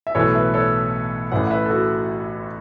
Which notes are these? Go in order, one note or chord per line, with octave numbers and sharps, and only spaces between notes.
E5
B1 A2 E3 A4 C#5
B4 E5
A4 C#5
A1 A2 E3 C#5 F#5
F#5
B4 E5
A4
F#4 B4